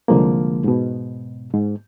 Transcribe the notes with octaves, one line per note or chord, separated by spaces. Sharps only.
C2 D3 F3 G#3 A#3
G#2 B2
G#2